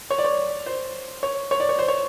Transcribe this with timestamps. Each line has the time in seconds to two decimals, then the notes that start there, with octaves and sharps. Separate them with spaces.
0.10 C#5
0.18 D5
0.24 C#5
0.66 C5
1.23 C#5
1.51 C#5
1.60 D5
1.69 C#5
1.79 C5
1.88 C#5